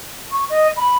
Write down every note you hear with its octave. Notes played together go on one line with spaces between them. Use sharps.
C#6
D#5
B5